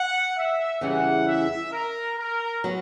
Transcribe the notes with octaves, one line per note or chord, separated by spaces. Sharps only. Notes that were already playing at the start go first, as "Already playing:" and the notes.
Already playing: F#5
E5
E2 C#3 E3 G3 C#4 F#5
E5
A#4
A#4
F#3 B3